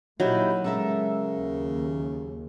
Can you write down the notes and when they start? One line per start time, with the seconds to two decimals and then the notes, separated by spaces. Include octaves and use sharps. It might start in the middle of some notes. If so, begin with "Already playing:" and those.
0.20 A#2 F#3 D#4 E4 G4
0.64 C#3 G#3 A4 A#4 E5
1.34 D#2